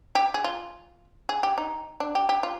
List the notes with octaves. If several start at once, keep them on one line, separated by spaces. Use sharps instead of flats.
G4
G#4
F4
G#4
G4
D#4
D4
G4
G4
F4